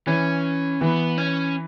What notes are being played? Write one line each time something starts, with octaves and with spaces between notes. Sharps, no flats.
E3 C#4
E3 B3
C#4